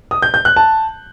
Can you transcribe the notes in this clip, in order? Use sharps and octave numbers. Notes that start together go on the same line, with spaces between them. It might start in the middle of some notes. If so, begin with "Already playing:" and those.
D#6
G6
G6
F#6
A5